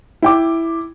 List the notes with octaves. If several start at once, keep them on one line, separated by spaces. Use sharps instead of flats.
E4 G5 D6